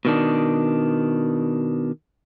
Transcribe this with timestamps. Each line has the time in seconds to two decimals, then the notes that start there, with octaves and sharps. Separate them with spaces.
0.05 B2 D#3 D4